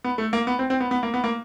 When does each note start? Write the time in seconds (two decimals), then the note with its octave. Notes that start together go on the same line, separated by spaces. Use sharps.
0.04 B3
0.18 A3
0.33 A#3
0.47 B3
0.59 C4
0.70 C4
0.80 B3
0.91 B3
1.03 A#3
1.14 B3
1.24 A#3